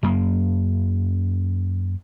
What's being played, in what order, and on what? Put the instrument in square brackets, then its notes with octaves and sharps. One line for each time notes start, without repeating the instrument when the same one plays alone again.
[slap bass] F#2 A#3